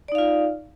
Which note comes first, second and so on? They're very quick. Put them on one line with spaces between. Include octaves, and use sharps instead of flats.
D5 D#4 F5 F4